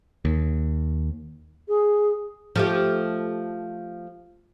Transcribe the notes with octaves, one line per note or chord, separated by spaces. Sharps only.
D#2
G#4
F3 A3 G4